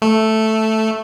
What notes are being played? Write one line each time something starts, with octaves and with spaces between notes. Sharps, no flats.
A3